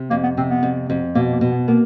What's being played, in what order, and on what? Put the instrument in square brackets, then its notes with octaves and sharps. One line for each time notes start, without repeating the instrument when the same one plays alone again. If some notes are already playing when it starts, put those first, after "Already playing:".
Already playing: [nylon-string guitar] C3
[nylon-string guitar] F2 [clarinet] A#3
[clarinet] B3
[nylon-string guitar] C3 [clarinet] C4
[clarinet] B3
[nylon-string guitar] F2
F2
[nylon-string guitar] B2 [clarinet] A#3
[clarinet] A#3
[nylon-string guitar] B2
[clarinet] B3
[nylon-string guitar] A#3 [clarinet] B3